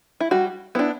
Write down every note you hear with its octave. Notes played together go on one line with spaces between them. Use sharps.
E4
G3 F#4
B3 D4 E4